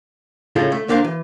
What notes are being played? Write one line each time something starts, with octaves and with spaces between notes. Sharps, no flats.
A2 C#3 G#3 E4 F4 A4
A3
C2 D3 A#3 D4 C5 F5
E3